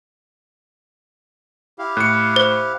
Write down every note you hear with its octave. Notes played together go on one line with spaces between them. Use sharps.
E4 G4 F5
A2 F#6 C#7
C5